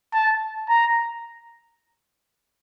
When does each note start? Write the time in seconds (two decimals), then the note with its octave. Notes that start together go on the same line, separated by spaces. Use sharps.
0.13 A5
0.69 A#5